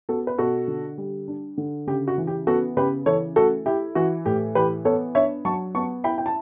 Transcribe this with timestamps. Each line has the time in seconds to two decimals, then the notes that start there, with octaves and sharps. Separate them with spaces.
0.09 B3 F#4 A4
0.27 B4
0.38 B2 F#4 A4
0.68 D3
0.98 G3
1.28 D4
1.58 D3
1.87 C#3 G4
2.08 F#4
2.18 E3
2.27 G4
2.47 B3 F#4 A4
2.77 C#3 G4 B4
3.06 E3 A4 C#5
3.36 A3 F#4 A4
3.66 E4 G4
3.95 E3 F#4
4.26 A2 G4
4.55 E3 G4 B4
4.85 B3 A4 C#5
5.15 D4 C#5 E5
5.45 F#3 A5 C#6
5.75 B3 A5 C#6
6.04 E4 G5 B5
6.18 G5
6.26 A5